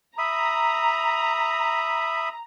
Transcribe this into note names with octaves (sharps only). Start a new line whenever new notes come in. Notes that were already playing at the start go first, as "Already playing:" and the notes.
E5 A#5 B5 D#6